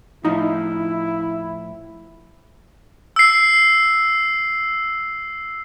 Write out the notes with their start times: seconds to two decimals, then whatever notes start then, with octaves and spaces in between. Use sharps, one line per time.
0.25 A2 F3 D#4 E4
3.16 E6 C7